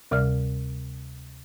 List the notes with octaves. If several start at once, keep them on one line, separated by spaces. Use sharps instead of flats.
D2 C3 G3 D5 F6